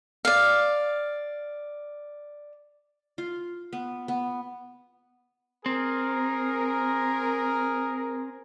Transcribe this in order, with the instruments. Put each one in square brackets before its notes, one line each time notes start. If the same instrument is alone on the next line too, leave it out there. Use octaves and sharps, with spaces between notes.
[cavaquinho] D5 F5
[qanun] F4
B3
B3
[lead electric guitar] C4 [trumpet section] G#4 A#4